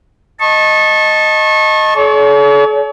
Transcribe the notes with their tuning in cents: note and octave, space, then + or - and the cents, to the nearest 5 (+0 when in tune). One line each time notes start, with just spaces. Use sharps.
D#5 +0 A5 +0 C#6 -30
A4 -45 C#5 +40